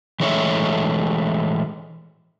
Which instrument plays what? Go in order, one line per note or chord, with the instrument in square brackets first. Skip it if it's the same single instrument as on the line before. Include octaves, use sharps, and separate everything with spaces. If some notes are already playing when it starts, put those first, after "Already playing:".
[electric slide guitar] E3 G#3 A3 C#5 E5